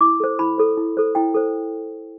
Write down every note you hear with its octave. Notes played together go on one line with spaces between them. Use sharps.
E4 D6
A4 C5
E4 B5
A4 C5
E4
A4 C5
E4 G5
A4 C5